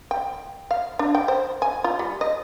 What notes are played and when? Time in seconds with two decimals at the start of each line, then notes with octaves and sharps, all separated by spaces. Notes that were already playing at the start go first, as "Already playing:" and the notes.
0.11 G5
0.71 F5
0.99 D4
1.15 G5
1.28 C5
1.62 G#5
1.84 F4
1.99 G3
2.21 D#5